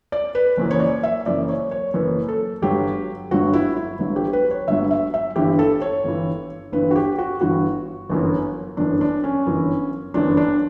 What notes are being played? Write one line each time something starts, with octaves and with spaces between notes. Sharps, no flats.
D5
B4
F#1 F#2 E3
C#5
D5
E5
F#1 F#2 E3 D5
C#5
C#5
F#1 F#2 E3 B4
A4
G1 G2 F#3 G4
G1 G2 F#3 F#4
E4
E4
G1 G2 F#3
G4
B4
C#5
G1 G2 F#3 E5
E5
E5
G1 G2 E3 G4
A4
C#5
G1 G2 E3
G1 G2 E3 B4
F#4
G4
F#4
G1 G2 E3 F#4
G1 F#2 E3
G1 F#2 E3 D4
D4
C#4
G1 F#2 E3
G1 F#2 E3 D4
D4